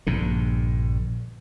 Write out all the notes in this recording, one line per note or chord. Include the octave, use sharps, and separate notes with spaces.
A#1 G2 D3